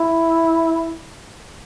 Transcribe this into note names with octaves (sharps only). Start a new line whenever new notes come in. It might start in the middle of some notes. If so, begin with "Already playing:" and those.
Already playing: E4